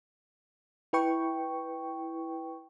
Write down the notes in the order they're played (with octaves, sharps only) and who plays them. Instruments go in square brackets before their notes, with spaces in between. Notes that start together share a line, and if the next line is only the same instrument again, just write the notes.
[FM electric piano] E4 B4 G5 C#6